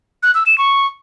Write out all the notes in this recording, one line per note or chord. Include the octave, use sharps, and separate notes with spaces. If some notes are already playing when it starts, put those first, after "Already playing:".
F#6
E6
E7
C#6